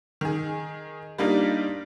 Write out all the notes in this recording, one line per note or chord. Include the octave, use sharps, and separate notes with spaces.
D#3 G#4
G3 A#3 D4 D#4 F4